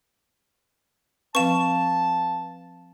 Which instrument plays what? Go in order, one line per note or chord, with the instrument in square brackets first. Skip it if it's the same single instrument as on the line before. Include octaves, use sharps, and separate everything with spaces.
[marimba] F3 C4 [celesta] B4 F5 [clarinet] A5 [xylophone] C#6 E7